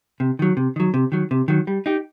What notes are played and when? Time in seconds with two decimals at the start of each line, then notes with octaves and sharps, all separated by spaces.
0.20 C3
0.39 D#3 F#3
0.57 C3
0.76 D#3 F#3
0.94 C3
1.12 D#3 F#3
1.31 C3
1.48 D#3 F#3
1.67 G3
1.86 D#4 G4